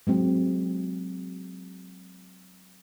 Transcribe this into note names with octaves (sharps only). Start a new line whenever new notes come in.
F#3 G#3 C4